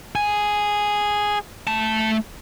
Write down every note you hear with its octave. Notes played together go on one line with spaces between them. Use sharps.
G#4
A3 A5